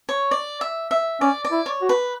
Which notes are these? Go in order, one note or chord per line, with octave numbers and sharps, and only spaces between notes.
C#5
D5
E5
E5
C#4 D5
D5
E4
C#5
F#4
B4